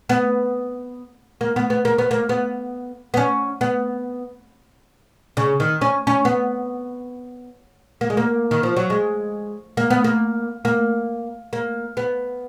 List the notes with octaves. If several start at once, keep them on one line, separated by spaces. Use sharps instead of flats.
B3
A#3
B3
B3
A#3
B3
A#3
B3
B3
C#4
B3
C#3
D#3
C#4
C#4
B3
A#3
G#3
A#3
D#3
F3
F#3
G#3
A#3
B3
A#3
A#3
A#3
B3